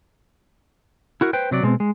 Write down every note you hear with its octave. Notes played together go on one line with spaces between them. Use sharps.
E4 F#4 A#4
B4 C5 G5
C3 F#3 D5
B2 G#3 C4
G#3